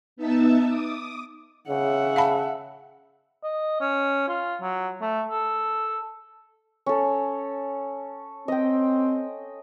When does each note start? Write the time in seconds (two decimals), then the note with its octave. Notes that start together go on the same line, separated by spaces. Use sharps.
0.16 B3 D#4 E5 A5 E6
0.68 D6 D#6
1.69 C#3 E5 F#5
2.16 F5 A5 B5
3.43 D#5
3.81 C#4
4.28 F4
4.61 F#3
5.01 A3
5.28 A4
6.86 C#4 A4
8.48 C4 D#5 G5